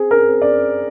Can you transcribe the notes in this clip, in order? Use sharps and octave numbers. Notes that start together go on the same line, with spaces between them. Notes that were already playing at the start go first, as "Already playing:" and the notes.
Already playing: C4 G#4
A#4
C4
D5